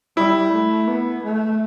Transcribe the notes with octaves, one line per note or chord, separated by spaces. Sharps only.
G3 E4
A3
B3
A3